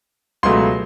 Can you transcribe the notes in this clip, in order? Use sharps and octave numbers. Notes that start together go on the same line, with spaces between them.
C#2 B2 F#3 A3 C6